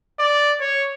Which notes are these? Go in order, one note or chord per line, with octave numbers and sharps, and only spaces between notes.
D5
C#5